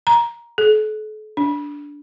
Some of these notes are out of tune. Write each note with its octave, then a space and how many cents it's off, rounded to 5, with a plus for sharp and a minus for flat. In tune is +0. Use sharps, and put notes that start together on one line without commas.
A#5 +10
A4 -40
D4 -15